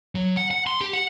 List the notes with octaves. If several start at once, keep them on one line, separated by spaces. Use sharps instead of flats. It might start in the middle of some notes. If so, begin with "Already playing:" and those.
F#3
F#5
F#5
C6
G4
F#5